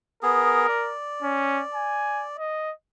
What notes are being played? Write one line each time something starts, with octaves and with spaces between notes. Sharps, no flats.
B3 G#4 A#4
D5
C#4
G#5
D#5